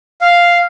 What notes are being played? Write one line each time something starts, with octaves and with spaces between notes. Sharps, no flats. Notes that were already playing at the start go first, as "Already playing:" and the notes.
F5